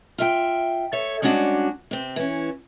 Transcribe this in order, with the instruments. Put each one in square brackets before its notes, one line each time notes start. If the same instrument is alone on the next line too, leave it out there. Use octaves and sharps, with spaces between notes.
[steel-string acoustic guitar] F4 E5 G5
A4 C#5 E5
G3 G#3 C#4 D4 F#4
C3 C4
E3 C#4